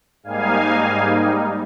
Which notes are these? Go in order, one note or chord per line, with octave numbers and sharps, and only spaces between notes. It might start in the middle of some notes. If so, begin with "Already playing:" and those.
G#2 G3 A#3 D#4 F5 G#5